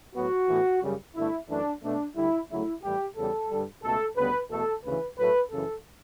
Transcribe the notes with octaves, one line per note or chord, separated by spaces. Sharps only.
A2 F#3 B3 F#4
A2 E3 B3
F#2 C#3 G3
G2 D3 A3 E4
F#2 E3 A3 D4
B2 A3 D4
D2 D3 G3 E4
D2 C#3 F#3 A3 E4
A2 E3 G3 G4
E2 C#3 G3 A4
G2 D3 G3
C#2 B2 A3 A4
D2 C#3 G3 B3 B4
E2 B2 A3 A4
D2 C#3 E3 B4
A2 F#3 A3 B4
F#2 C#3 E3 A4